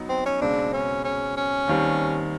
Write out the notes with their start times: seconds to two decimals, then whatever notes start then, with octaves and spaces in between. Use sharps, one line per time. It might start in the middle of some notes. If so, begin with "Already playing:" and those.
Already playing: F#3 B3 D#4
0.09 C4
0.26 C#4
0.41 C#2 B2 G#3 C4 D4
0.73 C#4
1.04 C#4
1.37 C#4
1.68 D#2 D#3 G3 C4